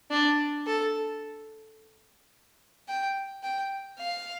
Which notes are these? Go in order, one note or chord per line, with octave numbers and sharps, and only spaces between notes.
D4
A4
G5
G5
F5